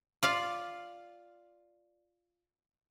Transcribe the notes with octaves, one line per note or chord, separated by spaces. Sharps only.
F4 D5 F5